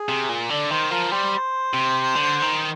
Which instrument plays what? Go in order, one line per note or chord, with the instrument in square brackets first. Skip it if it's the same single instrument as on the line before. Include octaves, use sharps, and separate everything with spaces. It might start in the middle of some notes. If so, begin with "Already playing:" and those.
Already playing: [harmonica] G#4
[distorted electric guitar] C3
A#2
[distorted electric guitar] D3 [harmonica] D5
[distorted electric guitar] D#3 [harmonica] C5
[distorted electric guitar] F3 [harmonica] A#4
[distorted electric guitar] G3 [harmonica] C5
[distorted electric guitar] C3
D3
D#3